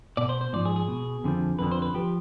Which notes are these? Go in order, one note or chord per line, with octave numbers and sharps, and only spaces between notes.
B2 D5
C5
C5
G#2 F3 D5
G#4
G#4
B2
F2 D3 F3
F2 D3 F3 B4
C5
B4
F3 G4